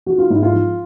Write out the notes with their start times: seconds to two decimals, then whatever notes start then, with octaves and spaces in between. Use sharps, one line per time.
0.06 F3 F#4
0.18 F4
0.30 G#2 E4
0.43 F4
0.53 F3